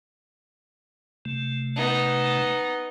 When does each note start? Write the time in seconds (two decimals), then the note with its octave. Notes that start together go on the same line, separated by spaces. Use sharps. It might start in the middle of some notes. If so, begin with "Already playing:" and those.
1.25 C3 A3
1.76 B3 D#4